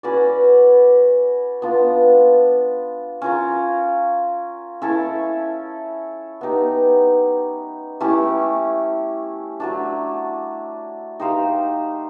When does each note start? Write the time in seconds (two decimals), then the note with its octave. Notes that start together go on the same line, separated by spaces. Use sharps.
0.03 C#4 F#4 B4 D5
1.62 B3 D4 F4
3.22 C#4 F4 A#4
4.82 C#4 E4 A4 C#5
6.41 B3 D#4 G4
8.00 A3 C#4 E4 G4
9.60 F#3 A3 D4
11.19 D#4 G4 C5 F5